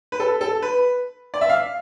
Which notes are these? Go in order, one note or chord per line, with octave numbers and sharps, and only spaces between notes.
B4
A4
A4
B4
D5
E5
F5